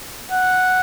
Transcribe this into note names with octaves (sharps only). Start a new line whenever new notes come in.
F#5